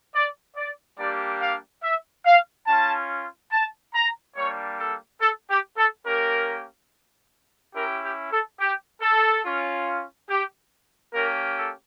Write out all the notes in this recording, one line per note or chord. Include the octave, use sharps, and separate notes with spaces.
D5
D5
G3 A#3 D4 G4 D5
F5
E5
F5
C#4 F4 A5
A5
A#5
G3 A#3 D4 C#5
A4
A4
G4
A4
A#3 C#4 G4 A#4
C#4 E4 G4 A#4
G4
A4
G4
A4
C#4 F4
G4
A#3 C#4 G4 A#4
A4